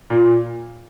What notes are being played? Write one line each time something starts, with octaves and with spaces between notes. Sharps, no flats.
A#2